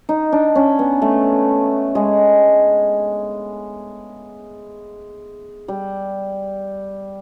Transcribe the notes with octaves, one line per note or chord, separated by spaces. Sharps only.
D#4
D4
C#4
B3
A3
G#3
G3